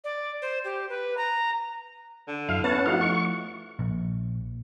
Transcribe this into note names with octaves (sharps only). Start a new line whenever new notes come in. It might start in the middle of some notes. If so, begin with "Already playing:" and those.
D5
C5
G4
B4
A#5
D3
F#2 E4 F5
B3 C#4 B4 C#5 F#5 A5
F3 A3 D#4 E4 F#4 F5
C#6
A#1